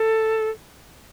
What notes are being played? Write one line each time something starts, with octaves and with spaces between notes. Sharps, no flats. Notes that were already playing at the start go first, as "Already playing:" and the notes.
Already playing: A4